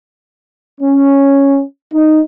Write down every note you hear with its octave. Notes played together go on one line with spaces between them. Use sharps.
C#4
D#4